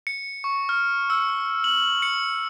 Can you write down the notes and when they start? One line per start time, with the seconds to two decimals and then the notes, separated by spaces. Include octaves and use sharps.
0.07 C#7
0.44 C#6
0.69 F6
1.10 E6
1.64 F#7
2.02 C#7